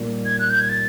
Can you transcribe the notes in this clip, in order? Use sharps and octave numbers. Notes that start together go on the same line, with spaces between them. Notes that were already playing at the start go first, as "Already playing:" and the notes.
Already playing: A#2 G3 D#4
G#6
F#6
G6
G#6
A6